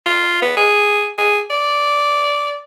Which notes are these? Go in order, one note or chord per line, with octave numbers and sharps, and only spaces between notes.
F4
B3
G#4
G#4
D5